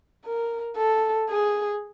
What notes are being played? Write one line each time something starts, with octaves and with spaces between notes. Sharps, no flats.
A#4
A4
G#4